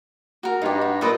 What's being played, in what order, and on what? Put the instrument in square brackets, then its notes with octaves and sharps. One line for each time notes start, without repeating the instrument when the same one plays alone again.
[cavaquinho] F#4 A#4
[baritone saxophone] G2 [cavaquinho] D#4 G4
[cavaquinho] F#4
[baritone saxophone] A#2 [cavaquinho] A4 B4 D#5